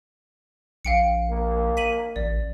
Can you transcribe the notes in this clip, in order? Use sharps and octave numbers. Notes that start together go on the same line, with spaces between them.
A#1 F5 G5 C#7
A#3
B6 D#7 F#7
A1 D5